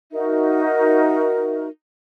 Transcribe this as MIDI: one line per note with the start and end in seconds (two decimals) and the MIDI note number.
0.12 1.67 63
0.12 1.67 66
0.12 1.67 70
0.12 1.67 76